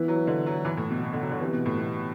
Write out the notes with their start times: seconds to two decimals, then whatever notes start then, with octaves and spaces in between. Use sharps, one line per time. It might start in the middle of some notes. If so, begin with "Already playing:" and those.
Already playing: E3 B3 E4 B4
0.08 F#3
0.27 D3
0.46 F#3
0.65 E3
0.77 A2
0.90 B2
1.03 B2
1.13 D3
1.22 F#3
1.31 D3
1.40 C3 E3 G3 B3
1.53 B2
1.66 A2
1.79 B2